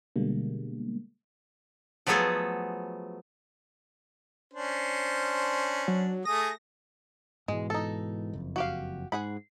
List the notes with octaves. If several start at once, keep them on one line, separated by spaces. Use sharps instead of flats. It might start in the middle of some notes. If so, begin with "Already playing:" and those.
B2 D3 G3 G#3 A#3
F3 F#3 A3 B3 G#4 A4
C#4 D4 C5
F#3
A3 G#4 D#6 A#6
G#2 B2 E3 G#3
D#4 A4
F#1 F2
F#4 G4 F5
G#2 G#4 F#5 B5